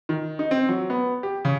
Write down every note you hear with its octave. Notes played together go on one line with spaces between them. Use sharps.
D#3
D#4
C4
F#3
B3
G4
C#3